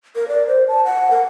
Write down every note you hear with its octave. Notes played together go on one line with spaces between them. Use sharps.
A#4
D5
C5
A5
F#5
A#4